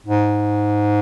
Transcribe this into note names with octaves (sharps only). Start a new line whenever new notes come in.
G#2